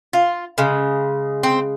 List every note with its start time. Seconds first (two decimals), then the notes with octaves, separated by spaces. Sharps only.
0.13 F4
0.58 C#3 G#3
1.43 C4